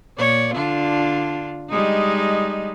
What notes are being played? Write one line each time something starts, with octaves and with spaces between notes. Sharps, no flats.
A#2 C#5 D5
D3 D4 F4
G3 G#3 D#4